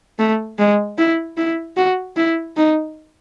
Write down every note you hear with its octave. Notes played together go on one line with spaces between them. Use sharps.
A3
G#3
E4
E4
F#4
E4
D#4